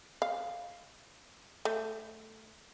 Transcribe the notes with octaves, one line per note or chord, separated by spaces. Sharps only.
F5
A3